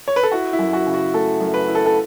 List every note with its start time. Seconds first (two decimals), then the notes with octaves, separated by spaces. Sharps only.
0.08 C#5
0.16 B4
0.23 A4
0.32 E4 F#4
0.53 E4
0.59 F#2
0.73 F#4
0.87 C#3
0.94 F#4
1.14 A3 A4
1.40 F#2
1.54 B4
1.68 E4
1.75 A4
1.86 A4